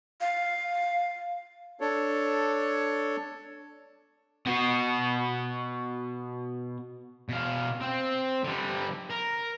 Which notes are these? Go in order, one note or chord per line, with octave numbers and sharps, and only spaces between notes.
F5
D4 A4 C#5
B2 F#4
B2 F5
C4
D3 G3
A#4